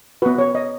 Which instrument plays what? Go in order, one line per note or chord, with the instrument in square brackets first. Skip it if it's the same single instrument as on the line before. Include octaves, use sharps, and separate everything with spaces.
[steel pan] B3 F#4 B4
C#5
D#5